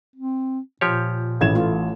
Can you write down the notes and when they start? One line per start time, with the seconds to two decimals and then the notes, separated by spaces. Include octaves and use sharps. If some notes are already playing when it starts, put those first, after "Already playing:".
0.16 C4
0.81 A#2 F3 G4 C#5
1.41 A1 E3 A3 E4 G#6 E7
1.55 A3 F4